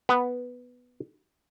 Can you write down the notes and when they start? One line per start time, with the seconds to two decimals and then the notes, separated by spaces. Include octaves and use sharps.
0.09 B3